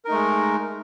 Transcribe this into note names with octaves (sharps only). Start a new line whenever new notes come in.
G#3 A3 D#4 A#4